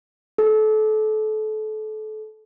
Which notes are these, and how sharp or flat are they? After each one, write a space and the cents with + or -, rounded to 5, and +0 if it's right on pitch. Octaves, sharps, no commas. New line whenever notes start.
A4 -30